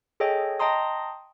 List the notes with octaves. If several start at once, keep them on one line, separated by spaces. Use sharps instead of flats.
G#4 A4 C#5 D#5 G5
D#5 G5 A5 A#5 C6 D#6